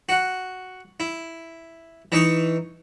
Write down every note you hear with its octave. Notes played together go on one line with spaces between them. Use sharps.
F#4 F#5
E4
E3 D#4 C#6 D#6